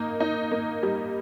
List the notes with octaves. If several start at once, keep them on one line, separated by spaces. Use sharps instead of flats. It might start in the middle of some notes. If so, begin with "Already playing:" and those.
Already playing: A#3 D#4
D#4
A#3
G3